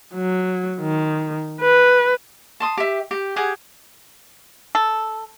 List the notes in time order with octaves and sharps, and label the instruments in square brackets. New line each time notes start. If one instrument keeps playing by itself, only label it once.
[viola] F#3
D#3
B4
[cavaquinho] A5 C6 D#6
G4 E5
G4
G4 G#4 F#5 G#5
[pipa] A4